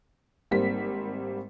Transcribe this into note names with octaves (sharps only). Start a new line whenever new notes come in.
G#1 G3 A#3 C4 B6